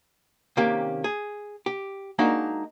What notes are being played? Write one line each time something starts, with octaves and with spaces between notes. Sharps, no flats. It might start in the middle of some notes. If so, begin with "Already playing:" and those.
C3 D#3 A#3 C#4 G4
G#4
G4
G#3 A#3 D4 D#4 F#4 A#4